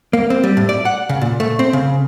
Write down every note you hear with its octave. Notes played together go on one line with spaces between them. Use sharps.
A#3
C4
G3
A2
D5
F#5
C#3
A#2
A3
C4
C#3